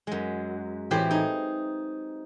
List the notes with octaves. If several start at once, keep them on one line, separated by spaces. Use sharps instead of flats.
F#2 G#3
A2 E3 C4 G4 B5 C6
D#4 G#4